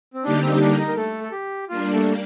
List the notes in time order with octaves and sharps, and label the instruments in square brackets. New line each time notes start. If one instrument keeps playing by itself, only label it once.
[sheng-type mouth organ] C4
[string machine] D3 G3 A#3 D#4 G4 [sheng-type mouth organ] D4
[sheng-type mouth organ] C4
D4
D#4
A#4
A3 A4
A4
G4
[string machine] G3 A#3 D4 [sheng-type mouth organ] F4
[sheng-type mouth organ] A3 A4